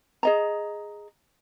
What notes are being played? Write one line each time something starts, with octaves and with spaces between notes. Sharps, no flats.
G#4 D#5 A#5